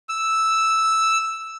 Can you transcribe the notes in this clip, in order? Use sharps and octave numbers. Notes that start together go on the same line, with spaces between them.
E6